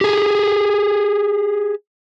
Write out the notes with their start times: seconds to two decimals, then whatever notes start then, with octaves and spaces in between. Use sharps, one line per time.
0.01 G4 G#4